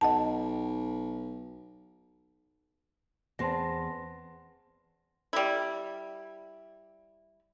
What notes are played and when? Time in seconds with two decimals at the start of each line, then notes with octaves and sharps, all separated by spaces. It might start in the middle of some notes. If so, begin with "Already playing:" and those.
0.01 B1 D#5 F#5 A5
3.39 E2 C4 A5 C6 A#6
5.33 G3 E4